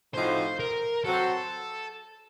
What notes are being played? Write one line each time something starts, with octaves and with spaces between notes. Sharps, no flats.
A2 F3 C4 D#4 F#4 C5
A#4
F#3 C4 F#4 A4 C5